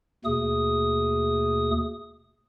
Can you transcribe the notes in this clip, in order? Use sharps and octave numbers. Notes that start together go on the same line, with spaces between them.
D#2 B2 A3 G#4 D#6